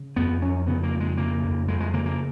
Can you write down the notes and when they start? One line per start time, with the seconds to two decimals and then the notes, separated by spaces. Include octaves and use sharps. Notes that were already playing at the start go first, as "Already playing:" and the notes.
Already playing: C#3
0.16 F2 B3
0.42 F2 C#4
0.67 C#3 B3
0.83 A#3
0.93 F2
1.00 G#3
1.17 C#3 A#3
1.43 F2
1.68 F2 G#3
1.80 G#3
1.93 C#3 A#3
2.06 A#3